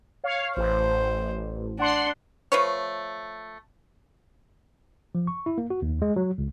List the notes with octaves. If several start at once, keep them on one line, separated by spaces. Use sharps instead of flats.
C#5 F5
A1 C5
D4 F#5 C6
F3 A3 B4 C#5
F3
C#6
E4
A#3
F#4
D#2
G#3
F#3
C#2